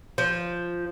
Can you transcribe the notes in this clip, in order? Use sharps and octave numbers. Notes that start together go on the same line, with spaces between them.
F3